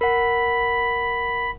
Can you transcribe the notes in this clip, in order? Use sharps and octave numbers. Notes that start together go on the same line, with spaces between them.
A#4 F#5 B5